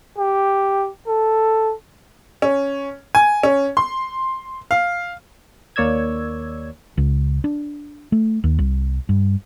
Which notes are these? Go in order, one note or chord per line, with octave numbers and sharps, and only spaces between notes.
G4
A4
C#4
G#5
C#4
C6
F5
D#2 A#3 C#5 D5 E6 G#6
C#2
D4
A3
D#2
C2
G2